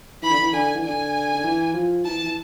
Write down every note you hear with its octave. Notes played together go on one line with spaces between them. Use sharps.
E3 B5
D3
E3
D3 G#5
E3
D3 G#5
D3
E3
F3
E3 A5
E3